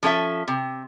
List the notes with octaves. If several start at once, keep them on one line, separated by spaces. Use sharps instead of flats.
F3 C#4 A4 D5 E5
C3